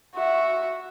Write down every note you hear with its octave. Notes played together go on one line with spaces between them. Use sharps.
F#4 E5